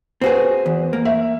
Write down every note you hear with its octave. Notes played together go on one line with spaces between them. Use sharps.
C4 F#4 G#4 B4 C5
E2
A#3
E5